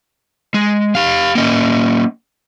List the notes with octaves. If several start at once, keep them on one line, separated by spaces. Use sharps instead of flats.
G#3
G4 F5
A#3 C#4 D#5